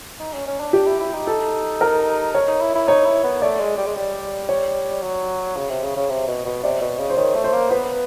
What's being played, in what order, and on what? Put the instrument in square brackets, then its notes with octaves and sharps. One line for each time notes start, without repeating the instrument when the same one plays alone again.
[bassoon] D#4
C#4
C#4
D4
[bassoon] D4 [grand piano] G4
[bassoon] E4
E4
D#4
[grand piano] A4
A#4
C#5
[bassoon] D#4
E4
E4
[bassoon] D#4 [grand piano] C#5
[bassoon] E4
B3
[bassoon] A3 [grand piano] D5
[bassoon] G#3
G3
G#3
G3
[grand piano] C#5
[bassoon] F#3
C#3
C3
C#3
C#3
C3
B2
B2
[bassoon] C3 [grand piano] D5
[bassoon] B2
C#3
[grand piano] C5
[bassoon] D#3 [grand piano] C#5
[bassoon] A3
[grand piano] C5
[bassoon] A#3
[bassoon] B3 [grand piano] B4